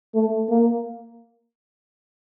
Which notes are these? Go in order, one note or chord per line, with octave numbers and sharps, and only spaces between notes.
A3
A#3